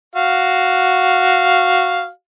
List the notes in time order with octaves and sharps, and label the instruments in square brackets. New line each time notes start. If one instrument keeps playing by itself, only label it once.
[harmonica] F#4 F5